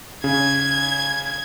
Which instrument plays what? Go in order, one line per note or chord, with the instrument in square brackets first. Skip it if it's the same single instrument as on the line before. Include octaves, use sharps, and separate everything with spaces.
[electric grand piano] C#3 [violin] G#6